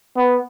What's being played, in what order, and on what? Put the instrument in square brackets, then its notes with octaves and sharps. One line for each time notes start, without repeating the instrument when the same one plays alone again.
[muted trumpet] B3